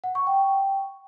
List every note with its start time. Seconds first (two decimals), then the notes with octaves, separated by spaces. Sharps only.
0.04 F#5
0.15 C#6
0.27 G5